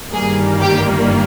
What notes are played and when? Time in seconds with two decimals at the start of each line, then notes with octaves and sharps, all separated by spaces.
0.12 G1 G2 D#3 G3 A#3 G#4
0.62 G4